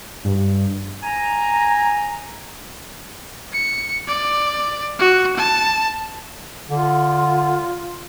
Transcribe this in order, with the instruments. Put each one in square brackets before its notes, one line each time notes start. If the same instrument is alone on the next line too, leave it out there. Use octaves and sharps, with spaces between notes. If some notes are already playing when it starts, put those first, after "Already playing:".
[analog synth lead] G2
[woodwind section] G#5 A#5
[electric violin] C#7
D5
F#4
A5
[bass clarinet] D3 [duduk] F4